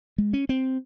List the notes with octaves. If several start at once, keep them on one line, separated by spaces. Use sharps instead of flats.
G#3
C#4
C4